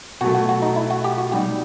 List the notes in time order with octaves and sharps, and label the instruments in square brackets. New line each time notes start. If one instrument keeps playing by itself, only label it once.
[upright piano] B2 F#3 A3 [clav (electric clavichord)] F#4
[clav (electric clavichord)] F#4
F#4
D#4
E4
F#4
G4
F#4
[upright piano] B2 G3 D#4 [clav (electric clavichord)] G4